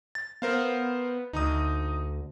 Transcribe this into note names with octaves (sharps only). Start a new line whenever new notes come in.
A6
B3 A#4 C5 F5
D2 D#4 A#5 D#6